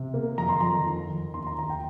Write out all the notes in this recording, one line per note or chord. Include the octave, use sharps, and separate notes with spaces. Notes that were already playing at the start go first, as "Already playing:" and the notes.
Already playing: C3
A#3
F2 A#5
C6
F2 A#5
D#3
F2
D#2 C6
A#5
D#2 A#5
G5